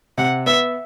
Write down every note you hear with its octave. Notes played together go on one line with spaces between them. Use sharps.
C3 F#5
B3 E5